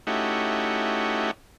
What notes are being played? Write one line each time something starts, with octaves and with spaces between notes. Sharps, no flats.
A3 C#4 D#4 E4 F#4 G4